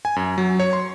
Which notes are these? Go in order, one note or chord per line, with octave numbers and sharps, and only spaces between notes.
G#5
F#2
F#3
C#5
C6